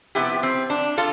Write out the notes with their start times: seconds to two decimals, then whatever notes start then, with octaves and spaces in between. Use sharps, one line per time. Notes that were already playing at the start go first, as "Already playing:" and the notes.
0.15 C3 F3 B3 E4 G4
0.43 C4
0.70 D4
0.98 F4 A4